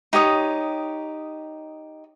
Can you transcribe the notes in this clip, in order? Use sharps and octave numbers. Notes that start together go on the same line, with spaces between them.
D#4 G4 C#5 D#6